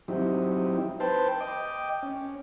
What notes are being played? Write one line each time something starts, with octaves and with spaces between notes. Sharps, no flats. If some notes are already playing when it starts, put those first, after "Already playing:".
F#3 C4 D#4 E4 G4
B4 C5 G5 A5
D#5 G5 D6
C#4